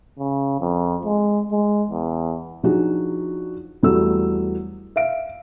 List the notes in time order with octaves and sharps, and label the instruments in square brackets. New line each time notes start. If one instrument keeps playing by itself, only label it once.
[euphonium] C#3
F2
G#3
G#3
E2
[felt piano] F3 F#3 D4 D#4 F#4 G#4
E2 F#3 G3 A3 E6
E5 F5 D7